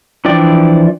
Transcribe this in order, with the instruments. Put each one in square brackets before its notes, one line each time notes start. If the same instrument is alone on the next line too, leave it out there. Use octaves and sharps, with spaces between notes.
[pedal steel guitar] E3 F3 D4 D5 G5